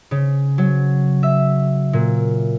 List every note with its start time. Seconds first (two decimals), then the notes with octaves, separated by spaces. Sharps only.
0.11 C#3
0.58 F#3
1.23 E5
1.93 A#2